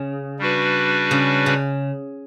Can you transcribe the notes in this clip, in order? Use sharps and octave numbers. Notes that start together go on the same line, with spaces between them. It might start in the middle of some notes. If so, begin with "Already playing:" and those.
Already playing: C#3
G3 D4 F#4 B4
C#3
C#3